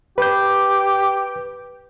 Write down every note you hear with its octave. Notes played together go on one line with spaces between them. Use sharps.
G4 B4 G6